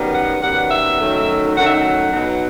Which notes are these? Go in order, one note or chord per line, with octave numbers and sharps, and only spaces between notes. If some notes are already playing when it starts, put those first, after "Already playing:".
Already playing: F#2 D#3 G3 B3
F#5
F#2 D#3 G3 B3 F#5
E5
F#2 D#3 F#3 A3 D#4
F#2 D#3 F#3 A3 D#4 F#5
E5
F#5
B2 F#3 B3 D#4